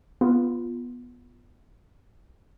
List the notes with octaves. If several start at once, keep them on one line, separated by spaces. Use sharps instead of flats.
B3 F4